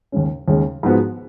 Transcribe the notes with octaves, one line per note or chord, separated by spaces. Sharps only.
D#2 C#3 G#3 C#4
D#2 C#3 G#3 C#4
G#2 F3 B3 F#4